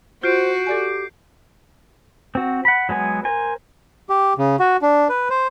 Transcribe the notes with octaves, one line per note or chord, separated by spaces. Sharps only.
F4 F#4 C5 G6 C7 D7
G4 A4 D5 G#5
C4 F#4
F#5 B5
F#3 G#3 B3 G#5
A#4 C5 G#5
G4
C#3
F#4
D4
B4
C5